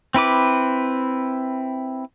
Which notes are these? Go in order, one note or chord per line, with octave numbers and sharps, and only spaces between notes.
C4 E4 B4 D6